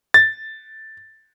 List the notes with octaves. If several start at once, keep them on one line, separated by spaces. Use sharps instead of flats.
A6